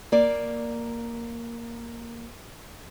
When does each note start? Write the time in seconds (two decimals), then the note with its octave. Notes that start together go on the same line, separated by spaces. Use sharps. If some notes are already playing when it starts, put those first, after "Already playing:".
0.12 A#3 D5